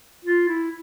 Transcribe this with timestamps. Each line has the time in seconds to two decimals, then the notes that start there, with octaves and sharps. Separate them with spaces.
0.25 F4
0.48 E4